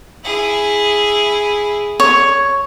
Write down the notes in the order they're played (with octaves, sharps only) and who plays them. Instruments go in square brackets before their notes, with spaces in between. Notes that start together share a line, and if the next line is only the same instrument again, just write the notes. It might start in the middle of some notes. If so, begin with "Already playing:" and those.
[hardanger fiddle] E4 G#4
[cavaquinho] C#5